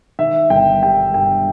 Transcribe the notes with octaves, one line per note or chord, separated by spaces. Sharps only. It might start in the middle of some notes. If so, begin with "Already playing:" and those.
D#3 E5
G1 G5
G3 G5
G2 G5